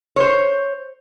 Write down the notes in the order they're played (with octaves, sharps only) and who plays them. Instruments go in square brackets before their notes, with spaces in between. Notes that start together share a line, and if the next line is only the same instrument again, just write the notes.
[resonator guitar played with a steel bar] C5 C#5